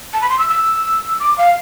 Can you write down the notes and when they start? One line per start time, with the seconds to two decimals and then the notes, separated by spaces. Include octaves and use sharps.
0.13 A5
0.21 B5
0.29 C6
0.38 E6
0.49 E6
1.19 D6
1.38 F5